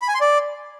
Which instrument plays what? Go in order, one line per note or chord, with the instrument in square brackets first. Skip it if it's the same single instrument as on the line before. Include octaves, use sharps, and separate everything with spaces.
[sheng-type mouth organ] B5
G#5
C6
D5